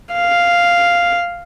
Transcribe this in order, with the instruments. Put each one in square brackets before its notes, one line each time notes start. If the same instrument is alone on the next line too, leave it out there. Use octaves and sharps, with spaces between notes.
[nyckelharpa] F5